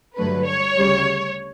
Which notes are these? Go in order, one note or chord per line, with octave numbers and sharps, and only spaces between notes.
G2 D3 F#3 A3 B4
C#5
D2 C#3 G3